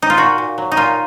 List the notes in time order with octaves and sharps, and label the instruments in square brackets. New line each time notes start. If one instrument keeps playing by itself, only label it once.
[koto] D#4
F4
A#2 F#4
A#2
F#3
D#4
A#2 F4